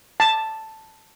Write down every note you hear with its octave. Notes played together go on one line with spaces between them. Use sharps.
A5